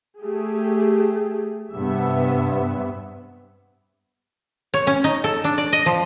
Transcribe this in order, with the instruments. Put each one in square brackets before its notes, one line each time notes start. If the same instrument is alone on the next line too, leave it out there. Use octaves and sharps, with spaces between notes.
[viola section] A3 G4 G#4
[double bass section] G2 C3 B3 [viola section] E5
[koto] C#5
C#4
D#4
A4
D4
D5
D#5
F3